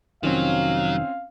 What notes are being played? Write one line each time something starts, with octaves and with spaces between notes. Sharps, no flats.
F1 B1 D#3 F#3 C4 C#4 F4 F5